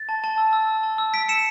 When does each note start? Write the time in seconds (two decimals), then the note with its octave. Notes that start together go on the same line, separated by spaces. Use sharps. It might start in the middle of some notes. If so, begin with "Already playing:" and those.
Already playing: A6
0.09 A5
0.24 A5
0.38 E6
0.53 E6
0.68 E6
0.83 A5
0.98 E6
1.13 E6 B6 D7
1.29 E6 C#7 E7